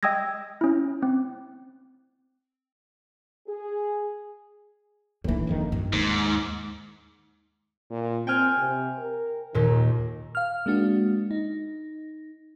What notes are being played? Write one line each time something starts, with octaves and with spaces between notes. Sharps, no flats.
D#5 G5 D#6 E6 G#6 A#6
C#4 E4
C4
G#4
D#2 A2 E3 D4
F#1 F2 D#3
G2
D#2 G#2 D#3
A#2
C4 G5 G#5 F6
C3
A#4
D#2 A#2 D#3
F5 F6
G#3 A#3 D4 F#4
D#4